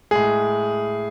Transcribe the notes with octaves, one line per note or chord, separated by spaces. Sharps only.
A2 G#3 G#4